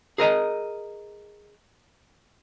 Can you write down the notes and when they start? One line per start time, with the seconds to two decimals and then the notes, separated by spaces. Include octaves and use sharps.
0.18 G#4 A#4 D#5 A#5